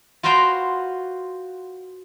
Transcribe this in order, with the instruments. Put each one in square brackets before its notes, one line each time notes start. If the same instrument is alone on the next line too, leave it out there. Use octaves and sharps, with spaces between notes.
[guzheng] F4 F#4 B4 C5 G5 A#5